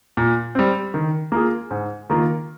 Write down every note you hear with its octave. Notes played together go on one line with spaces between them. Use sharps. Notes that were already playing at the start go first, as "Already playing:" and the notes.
A#2
G3 C4
D#3
A#3 F4 G#4
G#2
D#3 A#3 F4